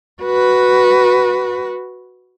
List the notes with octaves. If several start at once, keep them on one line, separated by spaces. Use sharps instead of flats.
F#4 B4